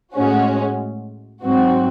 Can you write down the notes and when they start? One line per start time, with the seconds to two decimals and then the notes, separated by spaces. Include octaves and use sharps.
0.15 A2 G#3 C#4 F#4
1.43 G#2 F#3 C4 F#4